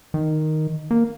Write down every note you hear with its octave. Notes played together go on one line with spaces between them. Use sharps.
D#3
A#3